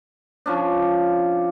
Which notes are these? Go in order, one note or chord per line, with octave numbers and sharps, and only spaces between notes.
F3 C#4 D4